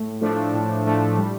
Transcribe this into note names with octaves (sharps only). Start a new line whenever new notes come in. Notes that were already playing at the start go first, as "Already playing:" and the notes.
Already playing: A2
F3 A3 D4
A2
F3 A3 D4
G3